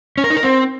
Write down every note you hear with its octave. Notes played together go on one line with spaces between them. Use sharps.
C#4
A#4
D#4
A#4
C4